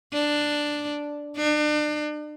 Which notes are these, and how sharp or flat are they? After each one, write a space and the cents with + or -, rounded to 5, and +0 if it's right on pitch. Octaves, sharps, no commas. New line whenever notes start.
D4 +5
D4 +35